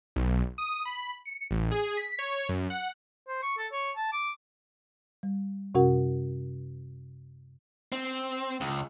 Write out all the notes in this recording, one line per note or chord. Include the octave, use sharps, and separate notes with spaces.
B1
D#6
B5
C#7
A1
G#4
B6
C#5
F#2
F#5
C5
C#6
A4
C#5
A5
D6
G3
F#2 C3 C#4 F#4 A#4 F#5
C4
C#2